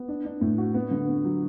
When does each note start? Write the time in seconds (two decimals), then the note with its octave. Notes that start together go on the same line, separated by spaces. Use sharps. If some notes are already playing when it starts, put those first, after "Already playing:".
Already playing: B3
0.08 D4
0.25 D4
0.41 A2
0.58 F#4
0.74 B3
0.91 D3
1.08 B3
1.25 F#3